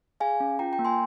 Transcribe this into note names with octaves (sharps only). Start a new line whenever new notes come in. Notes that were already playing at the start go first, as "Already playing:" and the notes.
G#4 F5 G#5
C#4
F4 G5 A#5
G5 A#5
A#3
G#5 C6